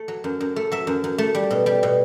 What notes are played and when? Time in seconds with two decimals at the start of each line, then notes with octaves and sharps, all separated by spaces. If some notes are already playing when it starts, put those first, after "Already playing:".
Already playing: A3
0.08 F#3
0.24 F#2
0.41 F#2
0.56 A3
0.72 F#3 E5
0.87 F#2
1.04 F#2
1.18 A3
1.35 G3
1.51 B2
1.66 G3
1.83 B2